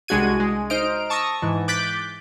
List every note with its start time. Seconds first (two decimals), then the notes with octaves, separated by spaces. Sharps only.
0.08 C2 G#3 D4 F#4 G#6 D#7
0.40 G#3
0.70 D#4 C5 D#5 F6 D7
1.10 A5 C#6 D#6 E6 A#6
1.42 G#2 E3
1.68 D6 F#6 G6 A6 B6 D7